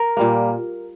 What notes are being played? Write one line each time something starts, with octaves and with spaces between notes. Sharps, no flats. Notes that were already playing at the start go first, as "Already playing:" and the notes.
Already playing: A#4
A#2 G3 A#3